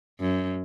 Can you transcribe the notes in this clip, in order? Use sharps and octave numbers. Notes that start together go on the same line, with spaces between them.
F#2